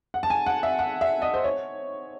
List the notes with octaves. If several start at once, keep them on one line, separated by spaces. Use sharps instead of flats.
F#5
A5
G#5
F#5
E5
F#5
E5
D#5
C5
C#5